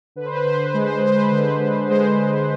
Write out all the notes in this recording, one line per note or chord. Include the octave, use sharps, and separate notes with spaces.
D3 B4
C5
B4
D3 C5
B4
C5
G#3 B4
C5
B4
G#3
C5
B4
D3 C5
B4
D3
G#3 C5
G#3